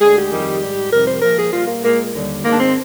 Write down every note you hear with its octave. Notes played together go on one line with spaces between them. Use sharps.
D2 D3 G#3 G#4
G4
F2 D#3 G3
G#2 G3
F2 C3 D#3 G3 A#4
C5
A#2 F3 G#3 A#4
G#4
A#2 G3 F4
A#3
A#2 G#3 A#3
D#2 D3 G3
G#2 D#3 G#3 A#3
D4
C4